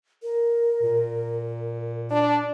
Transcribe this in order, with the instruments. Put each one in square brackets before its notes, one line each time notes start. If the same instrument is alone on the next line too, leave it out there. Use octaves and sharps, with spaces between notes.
[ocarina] A#4
[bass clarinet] A#2
[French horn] D4 [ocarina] D5